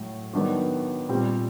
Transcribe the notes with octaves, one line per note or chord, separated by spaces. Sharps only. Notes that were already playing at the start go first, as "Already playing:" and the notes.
Already playing: A2 F#3 A3
D#3 F#3 B3 D4 F#4
A#2 G3 C4